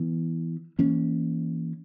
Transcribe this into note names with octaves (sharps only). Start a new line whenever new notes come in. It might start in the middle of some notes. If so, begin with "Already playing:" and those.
Already playing: E3 B3
E3 A#3 C#4